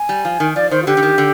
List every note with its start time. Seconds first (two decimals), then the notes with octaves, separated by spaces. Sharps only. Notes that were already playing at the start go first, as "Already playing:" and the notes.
Already playing: G#5
0.09 G3
0.25 F3
0.40 D#3
0.56 F3 D5
0.71 D#3 C5
0.83 F4
0.87 D3 G4
0.97 D3
1.03 D#3
1.18 D3